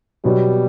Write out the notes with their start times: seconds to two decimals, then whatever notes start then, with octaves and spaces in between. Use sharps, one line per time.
0.24 B2 F#3 G3 B3 F#4